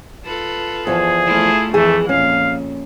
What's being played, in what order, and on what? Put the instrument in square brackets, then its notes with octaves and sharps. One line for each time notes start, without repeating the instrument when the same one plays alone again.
[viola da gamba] F4 A4 B4
[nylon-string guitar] E2 F3 [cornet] G#4
[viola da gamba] A3 E4 F4
[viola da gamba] F2 E3 [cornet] A3 [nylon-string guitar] G#4
[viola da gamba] F2 A#2 [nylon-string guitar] C#4 [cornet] F5